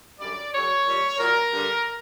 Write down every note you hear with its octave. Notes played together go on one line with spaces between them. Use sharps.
F#2 D3 G3 D5
F#2 C#3 F#3 C#5
A#2 G3
A#2 F#3 A#4
G2 D3 G3